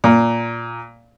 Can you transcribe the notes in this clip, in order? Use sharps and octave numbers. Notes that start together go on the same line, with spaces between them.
A#2